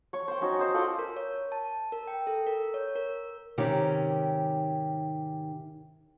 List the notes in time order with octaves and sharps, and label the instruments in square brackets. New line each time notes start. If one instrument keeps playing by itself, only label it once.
[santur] C#5 C#6
C5 G5
C#4 D#4 F#4 C#5
D#4 C5
F4 A4 D5 G5
[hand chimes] A#4
C#5
A5
A#4
G5
A4
A#4
C#5
A#4
[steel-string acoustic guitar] G#2 C3 D#3 C#4 G4